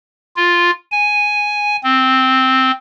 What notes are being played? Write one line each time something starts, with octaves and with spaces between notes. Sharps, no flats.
F4
G#5
C4